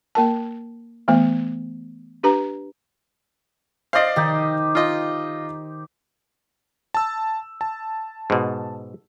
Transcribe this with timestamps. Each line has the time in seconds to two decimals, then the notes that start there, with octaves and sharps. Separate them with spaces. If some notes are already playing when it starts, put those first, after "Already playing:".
0.15 A#3 A#4 A5
1.08 E3 A3 B3
2.23 D4 G4 B4 A#5
3.93 C5 D5 D#5 F5
4.16 D#3 D#4 G4
4.75 F4 D#5
6.94 A5 E6
7.61 A5
8.30 G#2 B2